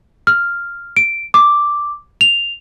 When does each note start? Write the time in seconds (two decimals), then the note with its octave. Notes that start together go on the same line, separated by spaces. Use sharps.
0.27 F6
0.97 D7
1.34 D6
2.21 F7